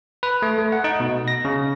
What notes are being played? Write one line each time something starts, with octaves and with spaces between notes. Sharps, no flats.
B4
A3
A3
F#5
D#4
B2
A#6
C#3